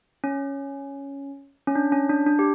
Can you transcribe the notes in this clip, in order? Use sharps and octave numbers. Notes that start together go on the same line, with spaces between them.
C#4
C#4
D4
C#4
D4
D4
G4